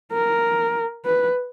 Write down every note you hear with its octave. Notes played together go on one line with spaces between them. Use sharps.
A#4
B4